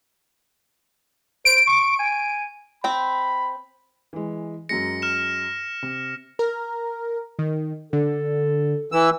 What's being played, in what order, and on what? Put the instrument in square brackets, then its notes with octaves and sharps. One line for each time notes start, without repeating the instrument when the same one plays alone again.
[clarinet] C5 [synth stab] D7
[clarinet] C#6
G#5
[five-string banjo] C4 G5 [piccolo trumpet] B5
[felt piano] E3 G#3
[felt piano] F#2 F#3 G#3 [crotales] A#6 C#7
[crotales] F6 E7
[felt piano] C3
[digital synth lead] A#4
D#3
[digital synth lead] D3 [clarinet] A4
[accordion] E3 E6